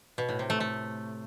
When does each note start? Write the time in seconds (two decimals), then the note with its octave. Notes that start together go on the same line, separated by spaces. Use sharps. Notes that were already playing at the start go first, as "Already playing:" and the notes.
0.18 B2
0.29 A2
0.39 C3
0.50 A3
0.60 A3